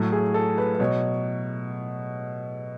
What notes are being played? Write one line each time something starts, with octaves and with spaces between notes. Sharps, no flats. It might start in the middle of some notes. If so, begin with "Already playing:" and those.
Already playing: A2 F#3 A4
G#4
A4
B4
B4
B2 F#3 C#5